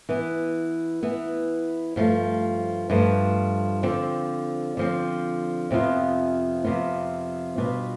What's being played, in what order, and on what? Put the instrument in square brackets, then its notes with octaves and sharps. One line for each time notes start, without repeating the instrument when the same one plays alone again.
[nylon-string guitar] E3 B3 E4
E3 B3 E4
G2 F3 A3
G2 F3 A3
D3 F3 C4
D3 F3 C4
F2 C3 F3 B3 F4
F2 C3 F3 B3 F4
B2 G3 D4 F4